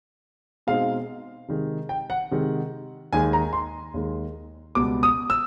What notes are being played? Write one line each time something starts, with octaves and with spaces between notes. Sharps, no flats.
B2 G#3 C4 D#4 F5
C3 D#3 G#3
G5
F#5
C3 D#3 G#3
D#2 D#3 G#3 G#5
A#5
C6
D#2 D#3 G#3
C#2 B2 G3 B3 D6
D#6
E6